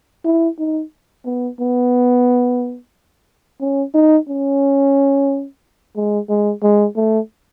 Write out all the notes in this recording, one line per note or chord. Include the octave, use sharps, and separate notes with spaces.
E4
D#4
B3
B3
C#4
D#4
C#4
G#3
G#3
G#3
A3